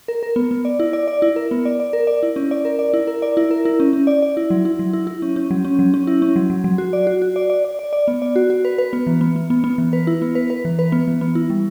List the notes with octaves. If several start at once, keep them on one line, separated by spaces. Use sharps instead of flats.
A#4
A#4
B3
B3
D5
E4
D5
D5
E4
A#4
B3
D5
D5
A#4
D5
E4
C#4
D5
A#4
D5
E4
A#4
D5
E4
A#4
E4
C#4
C#4
D5
D5
E4
F#3
E4
F#3
E4
E4
C#4
C#4
F#3
C#4
F#3
C#4
E4
C#4
F#3
F#3
F#3
F#4
D5
F#4
F#4
D5
D5
D5
D5
D5
B3
D5
F#4
F#4
B4
B4
B3
E3
B3
B3
B3
B3
E3
B4
E4
B3
B4
B4
E3
B4
B3
E3
B3
E4
G3